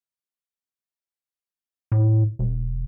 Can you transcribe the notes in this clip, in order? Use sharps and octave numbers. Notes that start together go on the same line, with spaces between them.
A2
E1